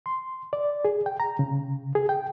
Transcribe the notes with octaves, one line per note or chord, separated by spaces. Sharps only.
C6
D5
G#4
G5
A#5
C#3
G#4
G5